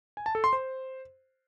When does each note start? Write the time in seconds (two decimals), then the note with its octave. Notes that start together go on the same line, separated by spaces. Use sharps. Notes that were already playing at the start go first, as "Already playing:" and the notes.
0.17 G#5
0.26 A5
0.35 A4
0.44 C6
0.53 C5